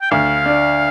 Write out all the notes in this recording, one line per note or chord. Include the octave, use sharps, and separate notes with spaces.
G5
D2 F5
D4